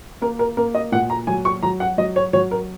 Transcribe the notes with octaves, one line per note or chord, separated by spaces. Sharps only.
A#3 A#4
A#4
A#3 A#4
D#5
A#2 F#5
A#5
F#3 G#5
C#6
F#3 A#5
F#5
F#3 D#5
C#5
F#3 C#5
A#4